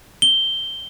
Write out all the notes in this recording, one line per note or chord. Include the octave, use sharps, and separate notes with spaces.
G7